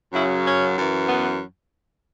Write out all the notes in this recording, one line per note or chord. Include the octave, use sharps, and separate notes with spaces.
F#2 C#3 F#3 E4
C#4
F#2 E3
B3